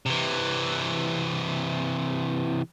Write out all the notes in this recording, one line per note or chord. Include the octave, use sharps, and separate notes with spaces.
C3 E3